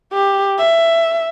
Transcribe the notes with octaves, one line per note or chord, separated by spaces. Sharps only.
G4
E5